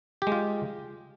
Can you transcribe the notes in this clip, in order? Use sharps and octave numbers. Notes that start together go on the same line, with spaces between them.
G#3 F4 G4